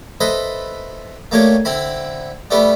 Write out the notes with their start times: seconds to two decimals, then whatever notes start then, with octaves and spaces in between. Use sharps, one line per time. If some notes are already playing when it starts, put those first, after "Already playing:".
0.20 A4 B4 C5 D#5 E5
1.31 A3 A#3 D4 G4 C#5
1.65 D3 C4 E4 B5
2.51 G3 A3 B3 D4 G4 E5